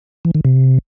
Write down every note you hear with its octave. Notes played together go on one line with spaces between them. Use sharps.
E3
D#3
C3